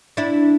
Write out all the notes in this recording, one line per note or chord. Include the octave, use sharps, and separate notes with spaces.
D4 E4